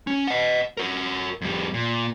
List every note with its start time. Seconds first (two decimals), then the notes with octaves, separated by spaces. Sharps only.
0.07 C#4
0.28 D#5 F#5
0.77 F#4 A#4
1.41 F2 G3
1.74 A#2